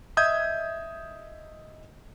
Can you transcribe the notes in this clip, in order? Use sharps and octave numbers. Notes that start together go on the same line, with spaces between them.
D#5 E5 D#6 G6 G#6